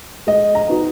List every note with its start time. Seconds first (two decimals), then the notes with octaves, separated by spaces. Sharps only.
0.27 G#3 D#5
0.55 A#5
0.69 B3 D#4 F#4